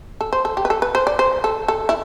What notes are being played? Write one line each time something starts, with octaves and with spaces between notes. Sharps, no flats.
A4
C5
A4
G4
B4
A4
B4
C5
D5
C5
A4
A4
E4